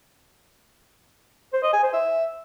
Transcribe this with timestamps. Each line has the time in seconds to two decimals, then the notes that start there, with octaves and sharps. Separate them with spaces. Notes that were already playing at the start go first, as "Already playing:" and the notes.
1.53 C5
1.63 D#5
1.73 G#5
1.83 C5
1.93 E5